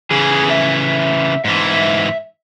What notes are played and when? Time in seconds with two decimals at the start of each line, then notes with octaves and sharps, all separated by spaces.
0.11 C#3 E3 G#4
0.51 E5
1.45 G#2 E3 E5